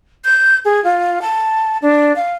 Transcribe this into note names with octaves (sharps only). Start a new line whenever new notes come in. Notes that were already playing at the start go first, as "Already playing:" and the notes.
G6
G#4
F4
A5
D4
F5